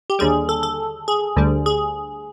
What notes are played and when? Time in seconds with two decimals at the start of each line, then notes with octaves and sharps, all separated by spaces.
0.10 G4
0.19 D#2 D3 G3 G#4
0.49 A4
0.63 A4
1.08 G#4
1.36 D2 D3 G3
1.66 G#4